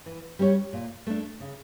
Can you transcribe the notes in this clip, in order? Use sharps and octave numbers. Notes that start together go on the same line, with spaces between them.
E3
G3 C#4 G4 C#5
A#2
A3 D4
C#3